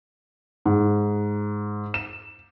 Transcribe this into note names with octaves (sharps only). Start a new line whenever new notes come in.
G#2
E7